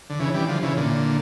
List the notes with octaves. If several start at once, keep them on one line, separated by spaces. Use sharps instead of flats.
D3
C#3 E3
E3 G3
D3 F3
C#3 E3
A#2 D3